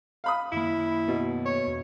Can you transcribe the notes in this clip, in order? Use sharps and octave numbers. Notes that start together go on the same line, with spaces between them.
F5 B5 D#6
F#2 D#3 A#3 E4
B2
C#5
E2 B2